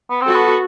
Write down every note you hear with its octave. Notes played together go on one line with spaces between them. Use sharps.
B3
C4
F#4 A4
B3